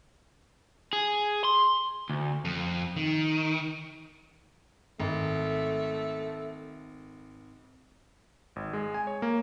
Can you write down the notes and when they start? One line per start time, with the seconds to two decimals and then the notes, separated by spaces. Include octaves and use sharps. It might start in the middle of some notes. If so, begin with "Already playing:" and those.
0.93 G#4
1.44 C6
2.10 D2
2.45 F2
2.96 D#3
5.00 G#1 A3
8.56 G#1
8.73 G#3
8.94 G#5
9.07 C#5
9.22 A#3